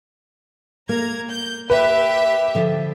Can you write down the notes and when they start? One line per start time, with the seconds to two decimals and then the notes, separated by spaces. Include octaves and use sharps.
0.89 A#3 A#5 G#6
1.31 G6
1.70 G4 B4 E5
2.55 D3 F3